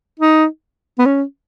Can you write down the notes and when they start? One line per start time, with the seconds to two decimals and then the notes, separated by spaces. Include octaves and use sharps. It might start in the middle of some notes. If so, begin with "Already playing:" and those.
0.20 D#4
0.98 B3
1.05 C#4